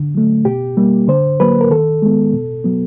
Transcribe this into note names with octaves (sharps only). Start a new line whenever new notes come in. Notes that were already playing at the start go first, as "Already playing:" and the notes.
Already playing: D3
F#3 A3
B2 G4
G3 A#3
D3 C5
F#3 A#3 B4
A#4
D#3 A4
G#3 B3
B2
F#3 B3